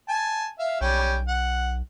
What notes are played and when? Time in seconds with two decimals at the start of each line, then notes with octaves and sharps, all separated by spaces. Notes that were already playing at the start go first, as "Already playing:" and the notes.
0.08 G#5 A5
0.59 E5 F5
0.81 B1 G3 C#4 G5
1.28 F#5